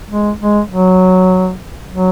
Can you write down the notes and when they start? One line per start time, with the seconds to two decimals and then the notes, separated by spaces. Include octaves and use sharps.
0.10 G#3
0.40 G#3
0.70 F#3
1.90 F#3